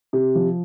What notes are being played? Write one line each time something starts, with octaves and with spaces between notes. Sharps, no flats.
C3
F3